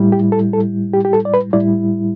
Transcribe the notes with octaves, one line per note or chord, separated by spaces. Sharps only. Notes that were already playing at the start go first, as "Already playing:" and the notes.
Already playing: A2 G3 E4
G4
A4
A4
G4
G4
A4
D5
B4
A2 G3 E4 D5